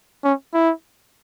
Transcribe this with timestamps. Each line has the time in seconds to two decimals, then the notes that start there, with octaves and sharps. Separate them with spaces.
0.24 C#4
0.53 E4